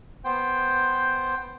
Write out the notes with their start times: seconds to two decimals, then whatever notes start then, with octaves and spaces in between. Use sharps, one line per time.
0.24 B3 C5 G5